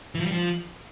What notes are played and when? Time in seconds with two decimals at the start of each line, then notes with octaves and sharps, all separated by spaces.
0.15 E3
0.20 F3
0.26 G3
0.32 F3